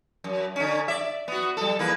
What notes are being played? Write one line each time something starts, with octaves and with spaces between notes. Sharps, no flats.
F#2
D3 C#4
D5 E5
B3 F#4
G3 A4
E2 A#3 B4